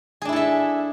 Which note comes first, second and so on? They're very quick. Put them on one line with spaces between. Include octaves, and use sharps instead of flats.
G#4 D4 E4 A4 E5